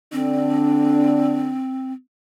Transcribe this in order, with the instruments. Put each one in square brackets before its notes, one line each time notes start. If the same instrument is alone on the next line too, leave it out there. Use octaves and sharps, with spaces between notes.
[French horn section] D3 D4 [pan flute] C4